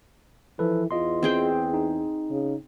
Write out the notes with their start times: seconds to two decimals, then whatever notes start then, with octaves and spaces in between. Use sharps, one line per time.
0.59 E3 F3 A4 B4
0.91 E2 F4 D#5 C6
1.23 C4 G#4 G5
1.74 D#4
2.31 C#3